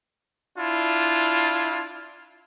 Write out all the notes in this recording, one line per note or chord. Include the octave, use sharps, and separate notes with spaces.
D4 E4 F4